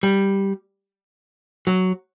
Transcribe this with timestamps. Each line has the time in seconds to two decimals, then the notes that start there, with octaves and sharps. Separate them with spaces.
0.03 G3
1.67 F#3